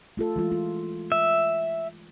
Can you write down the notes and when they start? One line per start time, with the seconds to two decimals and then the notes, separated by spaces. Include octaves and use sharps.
0.17 A3 F4 A4
0.36 E3 G#3 F4
0.52 F4
1.12 E5